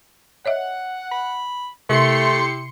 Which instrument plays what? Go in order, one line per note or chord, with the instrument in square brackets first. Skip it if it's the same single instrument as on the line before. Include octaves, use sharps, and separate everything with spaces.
[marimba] C#5 D#5 E5 [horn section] F#5
[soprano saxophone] B5
[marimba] C3 [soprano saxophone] A3 [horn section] E4 G4 [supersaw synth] C6 C#7